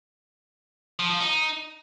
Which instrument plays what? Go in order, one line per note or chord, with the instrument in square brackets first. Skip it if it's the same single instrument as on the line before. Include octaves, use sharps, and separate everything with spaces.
[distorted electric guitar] F3
F3
D#4